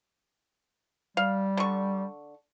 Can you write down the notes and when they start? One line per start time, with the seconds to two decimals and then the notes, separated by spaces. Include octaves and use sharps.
1.17 G3 F5
1.57 D3 C#6